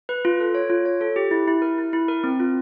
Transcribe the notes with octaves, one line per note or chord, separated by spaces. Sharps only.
B4
F4
A4
C#5
F4
C#5
A4
G4
E4
E4
A#4
E4
E4
A#4
C4
F4